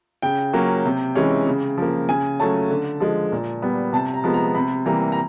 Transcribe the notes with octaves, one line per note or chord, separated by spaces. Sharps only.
C#3 G5
F#3 A#3 C#4
C3
E3 G#3 C#4
C#3
F3 A#3
C#3 G#5
F#3 A3 C#4 A5
D3
F3 G#3
A#2
G3 B3
C3 A5
A#5
F3 G#3 B3
A#5
C3 B5
E3 G3 A#3 A#5
A#5